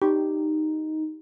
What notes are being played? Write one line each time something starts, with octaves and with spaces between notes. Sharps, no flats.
D#4 G4